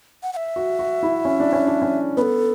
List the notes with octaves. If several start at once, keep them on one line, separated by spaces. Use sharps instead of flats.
F#5
F#5
E5
F#4
F#4
E4
C#4
D4
C#4
D4
C#4
B3 A4 B4